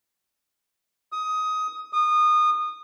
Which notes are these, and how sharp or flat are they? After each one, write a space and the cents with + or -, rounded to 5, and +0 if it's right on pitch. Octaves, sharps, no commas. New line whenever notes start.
D#6 +15
D#6 -25